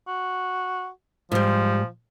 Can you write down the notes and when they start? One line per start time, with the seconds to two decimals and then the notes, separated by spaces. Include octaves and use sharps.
0.08 F#4
1.32 G#2 F3 G3